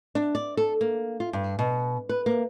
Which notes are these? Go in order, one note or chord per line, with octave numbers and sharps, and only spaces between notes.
D4
D5
A4
A#3
F4
G2
B2
B4
A#3